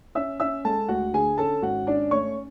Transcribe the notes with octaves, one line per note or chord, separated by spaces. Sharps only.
C#4 E5 E6
C#4 E5 E6
G#3 A4 A5
D2 F#4 F#5
D3 G#4 G#5
C#4 A4 A5
G#1 F#4 F#5
C#4 D4 D5
A3 C#5 C#6